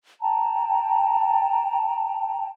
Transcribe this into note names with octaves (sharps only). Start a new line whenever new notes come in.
G5 A5 A#5